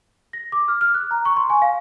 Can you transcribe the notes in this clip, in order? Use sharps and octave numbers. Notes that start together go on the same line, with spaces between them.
A#6
D6
F6
F6
F#6
A#5
C#6
C6
G#5
F5